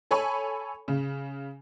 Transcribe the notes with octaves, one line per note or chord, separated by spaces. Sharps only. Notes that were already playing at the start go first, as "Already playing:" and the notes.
A4 C#5 G#5 B5 C#6
C#3